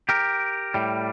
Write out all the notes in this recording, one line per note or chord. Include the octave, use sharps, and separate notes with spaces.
G4 A#4
A2 G3